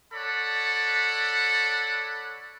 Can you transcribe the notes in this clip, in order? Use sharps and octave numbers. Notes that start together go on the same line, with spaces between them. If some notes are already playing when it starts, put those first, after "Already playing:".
A4 C#5 D5 F#5 B5